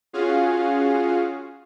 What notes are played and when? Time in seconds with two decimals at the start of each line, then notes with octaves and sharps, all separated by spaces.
0.13 C#4 F4 F#4 G#4 F5